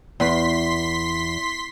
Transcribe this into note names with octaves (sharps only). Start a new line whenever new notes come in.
E2 C6 B6